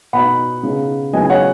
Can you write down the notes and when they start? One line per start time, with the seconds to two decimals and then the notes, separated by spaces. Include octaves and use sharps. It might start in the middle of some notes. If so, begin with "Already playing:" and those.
0.13 B2 B3 D#4 F#5 B5
0.63 C#3 B3 D#4
1.13 C#3 F#3 B3 D#4 D#5 G#5
1.24 G#5
1.29 C#5 F#5